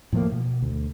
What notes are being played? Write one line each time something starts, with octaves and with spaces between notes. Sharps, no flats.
A2 F3 G#3 A#3
B2
D2